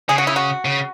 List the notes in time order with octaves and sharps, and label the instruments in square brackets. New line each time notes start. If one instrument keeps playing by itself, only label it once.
[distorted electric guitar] C#3 [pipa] G#4
[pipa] F#4
E4
F#4
[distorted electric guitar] C#3